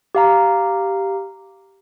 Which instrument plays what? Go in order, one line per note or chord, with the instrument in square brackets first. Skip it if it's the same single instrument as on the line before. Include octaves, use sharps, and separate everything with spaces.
[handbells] G4 F5 A#5